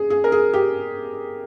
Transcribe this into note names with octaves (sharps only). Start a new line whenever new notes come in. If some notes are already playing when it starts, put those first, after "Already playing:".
Already playing: G#4
G#4
A#4
G#4
G4